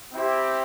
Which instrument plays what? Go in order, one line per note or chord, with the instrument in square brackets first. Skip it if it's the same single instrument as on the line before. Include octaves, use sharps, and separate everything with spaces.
[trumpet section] C4 E4 G4